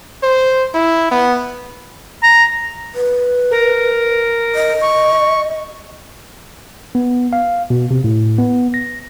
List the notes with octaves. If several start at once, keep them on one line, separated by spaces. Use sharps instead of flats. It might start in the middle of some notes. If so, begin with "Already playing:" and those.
C5
E4
B3
A#5
B4
A#4
D#5
C#6
B3
F5
B2
C3
A2
B3
A#6